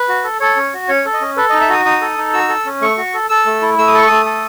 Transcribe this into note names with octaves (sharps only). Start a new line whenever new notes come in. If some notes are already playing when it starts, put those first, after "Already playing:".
Already playing: B4
F#4
A4
A4 C#5
C#4
F#4
C#4 C#5
A4
D#5
C#4
A4 B4
D#5
D#4
E5
F#4 D#6
D#4 D#6
A4
D#4
F#4 E6
A4
C#4
A3 C#6
F#4
A4
A4 E6
A3
E4
A3 E6
D#6
A4 C#6
A3 D#6
A4